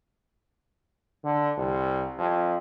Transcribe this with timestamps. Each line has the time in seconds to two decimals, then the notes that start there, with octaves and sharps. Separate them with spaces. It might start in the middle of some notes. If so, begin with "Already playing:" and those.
1.24 D3
1.57 C2
2.18 F2